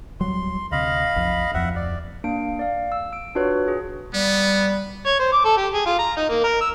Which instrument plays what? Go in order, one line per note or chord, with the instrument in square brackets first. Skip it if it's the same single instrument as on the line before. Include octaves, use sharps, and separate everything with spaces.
[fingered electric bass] D1 F#3 G3 [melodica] C6
[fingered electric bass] D2 C3 [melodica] D#5 F5 B5
[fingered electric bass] F1 B1 F3
[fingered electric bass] D1 F2 F3 [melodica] E5 F#5
[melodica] D5
[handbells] A#3 D4 F5 D7
D5 F5
E6
E6 D7
D4 F4 F#4 B4 C#5
G#4
[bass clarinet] G3 [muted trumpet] B3
[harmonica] C#5
C5
D6
A4
G4
G#4
F4
A#5
D#4
A#3
A#4
E6